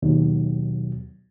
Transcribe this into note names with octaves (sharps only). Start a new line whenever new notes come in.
D#2 B2 F#3